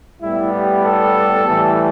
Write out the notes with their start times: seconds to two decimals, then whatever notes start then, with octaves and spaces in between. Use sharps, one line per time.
0.22 A2 G3 B3 E4
0.53 G4
0.84 A4
1.47 A2 E3 G3